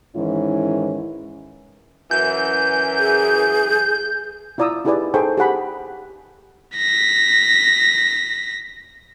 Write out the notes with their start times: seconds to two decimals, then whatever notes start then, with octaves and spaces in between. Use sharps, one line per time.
0.15 G#2 D#3 E3 C#4 E4
2.11 F#2 E3 G6
2.99 G#4
4.58 E4 F4 D5 A#5 D#6 E6
4.85 D#4 E4 G4 G#4 B4 D5
5.14 D#4 G#4 A4 C5 G5 C#6
5.37 G4 G#4 F#5 B5
6.77 A#6 B6